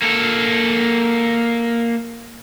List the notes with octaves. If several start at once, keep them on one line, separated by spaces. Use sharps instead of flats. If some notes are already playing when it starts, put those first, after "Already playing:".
A#3 A4